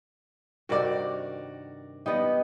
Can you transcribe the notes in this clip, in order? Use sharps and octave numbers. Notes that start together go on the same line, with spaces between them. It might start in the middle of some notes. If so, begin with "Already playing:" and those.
G2 C3 D#3 F#4 A#4 D5
G3 B3 D#4 D#5